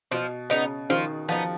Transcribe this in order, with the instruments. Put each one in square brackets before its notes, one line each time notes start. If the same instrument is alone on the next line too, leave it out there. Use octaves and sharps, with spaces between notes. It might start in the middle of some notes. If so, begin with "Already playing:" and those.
[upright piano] B2 [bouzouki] F3
[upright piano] C#3 [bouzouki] B3 D#4
[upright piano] D#3 [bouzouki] F3
[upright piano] F3 [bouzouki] B3 D#4